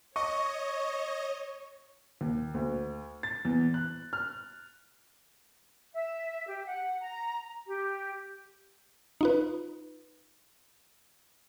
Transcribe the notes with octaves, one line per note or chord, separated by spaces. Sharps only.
C#5 D#5 C#6
D#2
D2
A6
E2
F#6
F6
E5
G4
F#5
A#5
G4
D#4 F4 B4